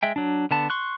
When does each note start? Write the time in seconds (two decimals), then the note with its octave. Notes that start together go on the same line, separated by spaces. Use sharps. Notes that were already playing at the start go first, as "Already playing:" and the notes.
0.03 G#3 E5 G5
0.16 F#3 D4
0.51 D3 B3 A5
0.70 C6 C#6 F#6